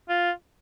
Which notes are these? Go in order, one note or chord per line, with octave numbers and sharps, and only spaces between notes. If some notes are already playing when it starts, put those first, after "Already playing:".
F4